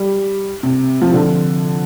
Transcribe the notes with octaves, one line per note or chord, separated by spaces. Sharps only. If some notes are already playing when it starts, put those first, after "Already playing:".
Already playing: G3
C3
F3
D3